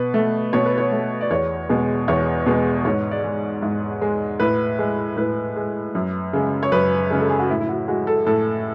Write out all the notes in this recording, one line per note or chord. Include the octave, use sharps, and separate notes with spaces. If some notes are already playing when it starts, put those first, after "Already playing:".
Already playing: B2 B4
A3
B2 C#5
B4
C#5
A3
D5
E2 C#5
B2 G#3
E2 C#5
B2 G#3
G#2 C#5
D5
G#3
G#2
G#3
A2 B4
G#3
A2 B4
G#3
F#2
C#3 G#3
C#5
F#2 B4
C#3 G#3
A4
G#4
F#4
A2 E4
E4
F#4
G#3 F#4
A4
A2 A4